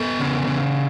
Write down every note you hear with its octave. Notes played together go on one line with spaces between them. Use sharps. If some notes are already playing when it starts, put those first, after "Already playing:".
Already playing: B3 A4
C#3
C#3